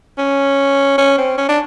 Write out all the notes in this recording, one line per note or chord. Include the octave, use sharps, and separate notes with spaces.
C#4
C#4
C4
C#4
D4